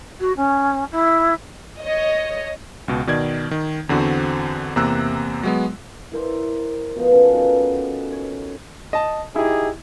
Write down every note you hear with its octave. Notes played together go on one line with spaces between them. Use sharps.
F#4
C#4
E4
C#5 D#5
C#2 B2
B2 D#3 D5 G#6
D#3
E2 D3 C4 F#4 C5
E2 C3 A#3 A#5 E6 F#6
F#3 G#3 B3
E4 A#4 C5 D5
B2 F3 B3
C#4 A4 A#4
B3 D#4 F#4 F5
C#5
D#5 A5
D#4 E4 G4 G#4